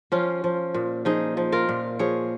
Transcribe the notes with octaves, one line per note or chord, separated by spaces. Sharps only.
F3 C#4 F4
F3
A#2
F3 D#4 G#4
F3
F4 A#4
A#2
F3 G#4 C#5